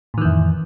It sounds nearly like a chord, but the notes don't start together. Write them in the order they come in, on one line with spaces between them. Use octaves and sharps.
A2 D#3 E3 F2